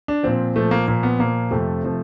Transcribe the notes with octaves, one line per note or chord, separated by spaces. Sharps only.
D4
A#2 F3 C4
A#2 F3 A3
A#3
A#2 F3 A#3
B3
A#2 F3 A#3
F2 C3 F3 A3
C3 F3